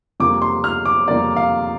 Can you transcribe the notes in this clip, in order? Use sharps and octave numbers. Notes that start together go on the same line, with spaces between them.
F2 C3 G3 A#3 D6
C6
F6
D6
F2 C3 G3 A#3 D5
F5